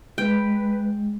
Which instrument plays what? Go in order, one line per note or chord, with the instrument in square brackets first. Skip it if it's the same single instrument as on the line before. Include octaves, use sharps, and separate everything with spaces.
[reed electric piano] G#3 [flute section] B4 [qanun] G5